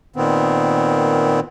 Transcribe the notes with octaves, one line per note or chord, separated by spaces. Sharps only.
A#2 D#3 B3 C4